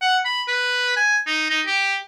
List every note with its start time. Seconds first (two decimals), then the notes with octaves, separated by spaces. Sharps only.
0.01 F#5
0.25 B5
0.48 B4
0.96 G#5
1.26 D#4
1.50 D#4
1.66 G4